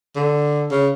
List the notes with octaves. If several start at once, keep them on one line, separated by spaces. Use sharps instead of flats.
D3
C#3